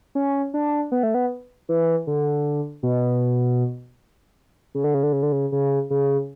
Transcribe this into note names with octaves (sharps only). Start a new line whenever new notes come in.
C#4
D4
B3
A3
B3
E3
D3
B2
C#3
D3
C#3
D3
C#3
D3
C#3
C#3
C#3